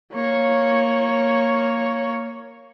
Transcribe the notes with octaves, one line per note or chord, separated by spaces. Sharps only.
A#3 C#5